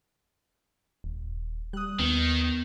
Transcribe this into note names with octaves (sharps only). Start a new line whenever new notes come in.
D#1
G3 D#6 F#6
D#2 D#3 B3